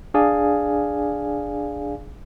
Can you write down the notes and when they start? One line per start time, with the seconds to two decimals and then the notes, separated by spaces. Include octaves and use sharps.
0.14 D4 G#4 D5 F5 G#5